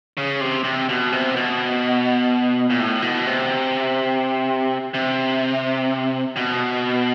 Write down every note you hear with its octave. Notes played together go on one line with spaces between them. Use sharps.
C#3
C3
C3
B2
C3
B2
A#2
A2
B2
C3
C3
B2